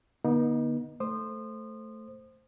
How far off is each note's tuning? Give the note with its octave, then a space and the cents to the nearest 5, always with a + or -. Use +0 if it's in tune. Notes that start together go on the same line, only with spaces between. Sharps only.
D3 +0 B3 -45 D#4 +0
A3 +0 C5 +5 D#6 -30